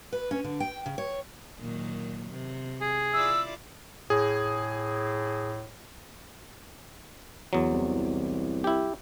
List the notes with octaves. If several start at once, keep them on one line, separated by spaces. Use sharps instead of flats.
B4
C#4
D3
G5
C#3
C#5
A#2 D#3 F#3
C3
G#4
E4 F4 D5 E6
A2 G#4
E2 F#3
C2
E4 G4